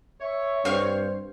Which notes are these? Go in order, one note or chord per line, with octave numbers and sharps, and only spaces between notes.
C#5 E5
G2 C4 C5 F5 C#6